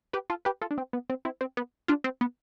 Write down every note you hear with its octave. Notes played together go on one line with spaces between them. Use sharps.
G4 B4
F4 A4
G4 B4
F4 A4
D4
C4
B3
C4
C4 E4
C4
B3
D4 F4
C4
B3